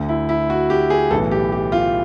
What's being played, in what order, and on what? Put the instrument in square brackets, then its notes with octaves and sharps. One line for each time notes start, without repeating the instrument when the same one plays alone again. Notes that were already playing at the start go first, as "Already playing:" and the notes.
Already playing: [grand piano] D2 D3
E4
E4
F#4
G4
G#4
B1 A2 E3 A4
G4
G4
F4